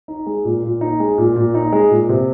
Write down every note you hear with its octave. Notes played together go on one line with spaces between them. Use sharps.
D#4
G#3
A#2
A#2
D#4
G#3
A#2
A#2
D#4
G#3
A#2
C3